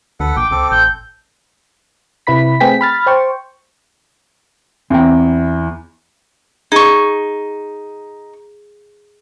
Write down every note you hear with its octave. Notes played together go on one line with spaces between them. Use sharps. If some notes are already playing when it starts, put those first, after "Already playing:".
D2 A4 B4 F#5
A#1 G5 D6
C#2 C4 A4
A1 G6
C3 E4 B4 B5 B6
A3 C4 G#4 B4 G5 B6
B5 F6 A6
C5 G5 C#6
E2 E3 C4 G5 A#5
D#4 G#4 C#6